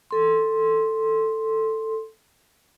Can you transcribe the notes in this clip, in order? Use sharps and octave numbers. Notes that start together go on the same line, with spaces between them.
A4 C6